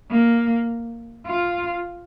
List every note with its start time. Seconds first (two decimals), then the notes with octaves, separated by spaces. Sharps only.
0.10 A#3
1.26 F4